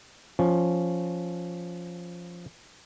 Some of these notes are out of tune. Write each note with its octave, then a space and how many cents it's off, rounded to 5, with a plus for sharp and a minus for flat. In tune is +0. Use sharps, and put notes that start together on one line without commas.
F3 +0 C#4 +0